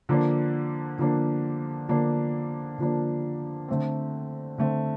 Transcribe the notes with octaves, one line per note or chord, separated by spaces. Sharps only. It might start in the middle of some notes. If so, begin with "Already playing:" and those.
D3 F3 A#3 D4
D3 F3 A#3 D4
D3 F3 A#3 D4
D3 F3 A#3 D4
D3 A3 C4
D3 A3 C4